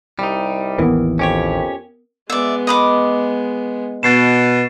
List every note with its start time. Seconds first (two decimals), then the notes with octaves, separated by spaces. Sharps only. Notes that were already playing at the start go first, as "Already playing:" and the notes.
0.19 C2 G3 D#4
0.78 A1 D#2 E3 B3 C4 A#4
1.19 F2 C#4 G4 C#5
2.30 G#3 B3 D5 E5
2.67 D#5 B5 D6
4.03 B2 A6 C7 E7